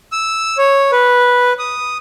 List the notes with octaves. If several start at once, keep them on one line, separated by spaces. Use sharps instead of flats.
E6
C#5
B4
D#6